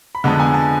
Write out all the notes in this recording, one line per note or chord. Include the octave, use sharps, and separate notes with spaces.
B5
F2 D3 G#3 B3 A5
G#5
A5